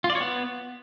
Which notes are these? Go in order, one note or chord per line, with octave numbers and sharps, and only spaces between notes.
F4
D5
C#5
B3